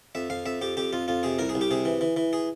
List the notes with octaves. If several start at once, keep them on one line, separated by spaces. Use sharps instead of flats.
F2 E5
F2 F5
F2 E5
F2 G4
F2 G4
F2 F4
F2 F4
C3 G#4
C2 A#4
G#4
C2
G4
C3 G#4
E3
E3
E3
G#4